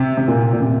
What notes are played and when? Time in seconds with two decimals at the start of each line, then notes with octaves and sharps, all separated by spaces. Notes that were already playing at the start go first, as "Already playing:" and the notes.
Already playing: C3
0.17 C3
0.28 A#2
0.53 A#2
0.60 C3